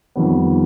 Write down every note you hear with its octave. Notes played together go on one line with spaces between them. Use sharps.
F2 D#3 G3 B3